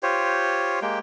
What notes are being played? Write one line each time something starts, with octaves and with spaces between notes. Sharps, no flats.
F4 G4 C5 C#5
G#3 A#3 G4 G5